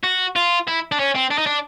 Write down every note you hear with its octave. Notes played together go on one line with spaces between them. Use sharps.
F#4
F4
E4
D4
C#4
C4
D4
D#4
D4